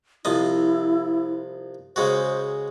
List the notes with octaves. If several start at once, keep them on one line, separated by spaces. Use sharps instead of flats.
C2 F3 E4 D#5
C#3 G#3 F#4 C5